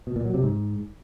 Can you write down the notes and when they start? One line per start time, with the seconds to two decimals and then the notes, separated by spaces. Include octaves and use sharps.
0.07 B2
0.16 A#2
0.25 F#3
0.34 C3
0.43 G#2